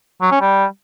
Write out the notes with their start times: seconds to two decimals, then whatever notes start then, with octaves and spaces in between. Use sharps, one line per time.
0.22 F#3
0.32 C#4
0.41 G3